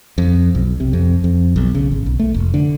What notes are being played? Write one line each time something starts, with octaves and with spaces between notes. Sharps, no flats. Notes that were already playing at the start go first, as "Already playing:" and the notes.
F2
B1
C3
F2
F2
B1
C#3
G#1
B1
A3
F1
D3